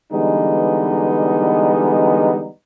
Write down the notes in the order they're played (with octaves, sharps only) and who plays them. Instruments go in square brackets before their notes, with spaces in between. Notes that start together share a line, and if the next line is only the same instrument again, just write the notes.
[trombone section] D3 E3 G3 G#3 B3 D#4